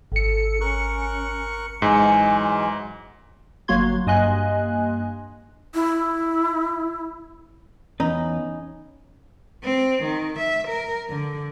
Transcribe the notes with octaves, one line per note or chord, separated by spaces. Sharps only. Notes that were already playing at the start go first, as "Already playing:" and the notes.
G#1 A4 C#7
C#4 A#4 C#6 F#6
G#2 E3 F#3 G#3 G#5
G1 F#3 A#3 F#4 C6 G#6
G2 A#3 D#5 G#5 C6 F#6
E4
E2 C#4 D#4 B4
C4
D#3
E5
A#4
D3